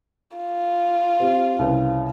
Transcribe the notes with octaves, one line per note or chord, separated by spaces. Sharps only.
F4
C4 G4
C2 C#3 B4